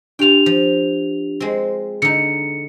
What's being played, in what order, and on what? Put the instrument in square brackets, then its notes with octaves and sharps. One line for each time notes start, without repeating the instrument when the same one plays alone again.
[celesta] D4 G4 F7 [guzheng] F4 G5
[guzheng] F3
G#3 C4
[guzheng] D3 D#4 [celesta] C#7